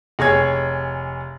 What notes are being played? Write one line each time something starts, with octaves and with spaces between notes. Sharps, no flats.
F1 G#4 C#5 G#6